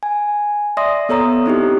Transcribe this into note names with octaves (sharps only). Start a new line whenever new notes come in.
G#5
D5 E5 C6 D#6 A#6
B3 A4 C#5 A#5 D#6
C4 D#4 E4 G4